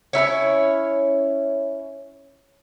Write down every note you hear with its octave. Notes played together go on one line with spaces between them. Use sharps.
C#4 D#4 E4 C#5